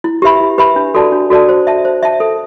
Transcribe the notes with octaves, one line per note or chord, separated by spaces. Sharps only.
E4
G4 B4 E5 B5
E4
G4 B4 E5 B5
D4
F#4 A4 D5 A5
D4
F#4 A4 D5 A5
C5
E5 A5
C5
E5 A5
A4